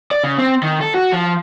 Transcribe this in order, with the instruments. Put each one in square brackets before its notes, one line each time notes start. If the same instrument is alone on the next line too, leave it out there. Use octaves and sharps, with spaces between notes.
[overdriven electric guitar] D5
C#3
C4
D#3
A4
F#4
F3